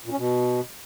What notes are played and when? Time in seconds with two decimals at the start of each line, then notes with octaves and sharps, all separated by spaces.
0.05 A#2
0.12 C#4
0.18 B2